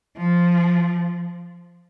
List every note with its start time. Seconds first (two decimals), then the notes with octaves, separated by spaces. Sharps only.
0.17 F3